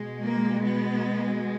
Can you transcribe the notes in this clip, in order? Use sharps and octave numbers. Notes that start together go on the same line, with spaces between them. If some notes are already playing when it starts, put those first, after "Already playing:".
Already playing: B2 G#3
A#3
B3